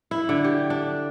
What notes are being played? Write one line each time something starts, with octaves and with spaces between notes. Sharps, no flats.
E4
D3
G4
D4